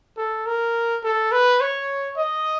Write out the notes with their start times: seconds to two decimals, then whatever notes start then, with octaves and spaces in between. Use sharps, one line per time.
0.17 A4
0.46 A#4
1.03 A4
1.32 B4
1.61 C#5
2.17 D#5